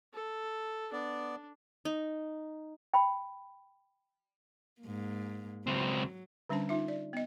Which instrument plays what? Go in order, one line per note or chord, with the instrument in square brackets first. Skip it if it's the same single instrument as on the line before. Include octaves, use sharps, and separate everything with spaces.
[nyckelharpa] A4
[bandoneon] B3 D5 [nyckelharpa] D4
[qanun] D#4
[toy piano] G5 B5
[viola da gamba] G#2 A#3
[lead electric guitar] C#2 C4 [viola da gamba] F#3
[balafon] D3 G3 C#4 D4 C5 A5
D#4 F4 E5
D5
B3 D#5